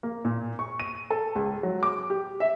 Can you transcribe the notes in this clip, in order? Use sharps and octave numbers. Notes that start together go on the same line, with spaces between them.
A#3
A#2
C#6
D#7
A4
C#2
F#3
D6
G4
E5